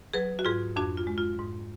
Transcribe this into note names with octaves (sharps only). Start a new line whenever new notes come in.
F#3 G#4 B4
F#4
G#2 F4 G#4
F2 D4 F#4
F4
G#3
F4
G#2